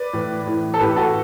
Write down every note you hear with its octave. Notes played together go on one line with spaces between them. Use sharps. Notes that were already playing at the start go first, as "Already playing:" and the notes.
Already playing: B4 D5
A2 E3
A2 E3
A4
A2 E3 G4 B4
F#4 A4